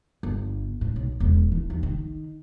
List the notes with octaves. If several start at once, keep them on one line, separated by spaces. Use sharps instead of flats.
G1
A2
B1
E1
E3
D#2
D#3